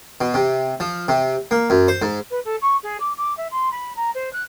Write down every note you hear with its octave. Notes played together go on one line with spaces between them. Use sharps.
B2
C3
F3
C3
A#3
F#2
C5
G#2
B4
A4
C#6
G#4
D6
D6
E5
C6
B5
A#5
C5
F#6